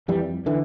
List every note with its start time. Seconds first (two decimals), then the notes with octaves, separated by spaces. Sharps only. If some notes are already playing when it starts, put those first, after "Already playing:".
0.08 F2 E3 G3
0.46 D3 E3